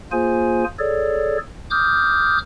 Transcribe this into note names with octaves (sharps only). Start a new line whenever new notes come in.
A#3 F4 G#4 C5 G#5
G#4 A4 C#5 D5
D6 D#6 F6 G6